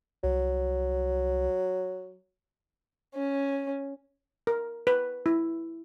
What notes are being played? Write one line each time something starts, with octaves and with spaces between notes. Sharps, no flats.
C2 F#3
C#4
A#4
B4
E4